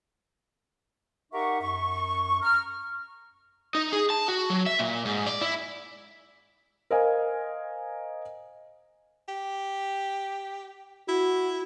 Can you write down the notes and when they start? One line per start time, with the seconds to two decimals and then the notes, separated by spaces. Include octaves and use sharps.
1.33 D#4 G4 A#4 E5 F#5 C#6
1.61 F#2 C#6
2.42 A#5 F6
3.75 D#4
3.92 G#4
4.10 A5
4.28 F#4
4.50 F#3
4.66 E5
4.79 A#2
5.05 G#2
5.27 D5
5.41 E4
6.90 A#4 C5 D#5 F5 G#5
9.28 G4
11.08 E4 F#4